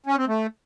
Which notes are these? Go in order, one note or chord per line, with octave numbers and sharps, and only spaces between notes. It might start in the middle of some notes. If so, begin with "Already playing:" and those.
C#4
C4
A3